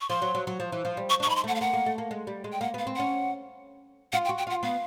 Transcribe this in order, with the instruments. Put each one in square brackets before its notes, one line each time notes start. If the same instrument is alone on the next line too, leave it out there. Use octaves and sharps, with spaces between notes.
[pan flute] C#6
[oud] F3 [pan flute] C6
[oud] F#3
F#3
F#3
F3
E3
F3
G3
[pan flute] C#6
[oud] D4
[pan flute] C#6
[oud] D#4 [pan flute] B5
[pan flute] C6
[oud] A3 [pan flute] F#5
[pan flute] F5
[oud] A#3 [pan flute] F#5
[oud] A#3
A3
A#3
G#3
G3
G#3
[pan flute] G5
[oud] A#3 [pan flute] F#5
[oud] B3 [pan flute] F5
[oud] C4
[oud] C#4 [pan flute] F#5
[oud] F4 [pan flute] F#5
[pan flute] G5
[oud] F#4
[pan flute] G5
[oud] F4 [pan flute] F#5
[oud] B3 [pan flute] F5